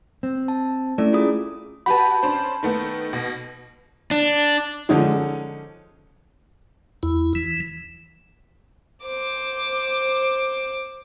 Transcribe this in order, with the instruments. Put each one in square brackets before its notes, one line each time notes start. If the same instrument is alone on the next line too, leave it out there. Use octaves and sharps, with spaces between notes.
[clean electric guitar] C4
[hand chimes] A5
[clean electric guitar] A3 [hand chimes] C#4 E4 D5
[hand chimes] F4 G#4 D#6
[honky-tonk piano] F#4 G4 B4 [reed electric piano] A5 B5
[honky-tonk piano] C#4 D4 C5
D#3 A3 B3
B2
[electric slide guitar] D4
[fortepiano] D3 F3 G#3 C#4 D#4
[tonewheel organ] E2 E4
E3
[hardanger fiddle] C5 D6